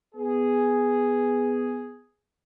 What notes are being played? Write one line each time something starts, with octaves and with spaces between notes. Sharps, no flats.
B3 G#4